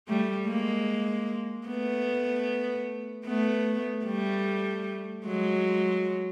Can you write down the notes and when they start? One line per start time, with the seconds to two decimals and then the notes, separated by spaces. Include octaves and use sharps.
0.08 G3 A3
0.48 G#3 A#3
1.67 A3 B3
3.26 A3 B3
4.05 G3 A3
5.25 F#3 G#3